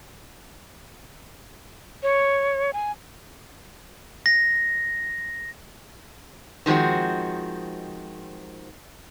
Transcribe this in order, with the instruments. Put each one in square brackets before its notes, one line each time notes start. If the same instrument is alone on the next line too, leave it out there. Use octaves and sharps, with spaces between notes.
[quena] C#5
G#5
[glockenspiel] A#6
[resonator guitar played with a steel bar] D#3 F3 G#3 C4 F#4